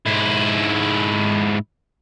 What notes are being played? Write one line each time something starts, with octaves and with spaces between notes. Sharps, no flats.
G#2 E4